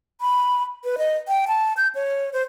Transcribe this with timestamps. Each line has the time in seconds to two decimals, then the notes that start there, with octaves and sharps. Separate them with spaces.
0.21 B5
0.84 B4
0.98 D#5
1.28 G5
1.48 A5
1.77 G6
1.95 C#5
2.33 C5